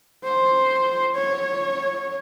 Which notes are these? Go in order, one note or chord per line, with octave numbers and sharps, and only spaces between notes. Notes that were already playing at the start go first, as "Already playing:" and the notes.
C5
C#5